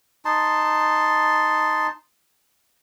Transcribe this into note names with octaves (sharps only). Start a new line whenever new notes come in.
D#4 A5 C6